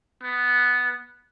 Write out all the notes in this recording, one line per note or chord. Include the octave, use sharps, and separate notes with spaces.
B3